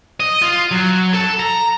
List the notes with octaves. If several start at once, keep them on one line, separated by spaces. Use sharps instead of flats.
D#5
F4
F#3
A4
A#5